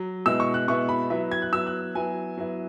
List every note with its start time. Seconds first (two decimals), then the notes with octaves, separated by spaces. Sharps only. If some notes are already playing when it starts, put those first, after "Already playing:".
Already playing: F#3
0.26 B2 G#3 B3 E4 E6
0.40 C#6
0.54 F#6
0.68 B2 G#3 B3 E4 C#6
0.89 B5
1.10 F#3 B3 E4 E5
1.31 G#6
1.42 F#6
1.53 F#3 B3 E4 E6
1.67 F#6
1.95 F#3 B3 E4 G#5
2.37 F#3 B3 E4